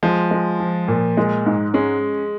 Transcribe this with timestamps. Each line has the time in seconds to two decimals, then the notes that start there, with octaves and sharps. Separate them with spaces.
0.03 F3 G#3
0.31 G#3
0.60 F3
0.88 A#2
1.17 G#3
1.46 G#2
1.74 G#3 C#4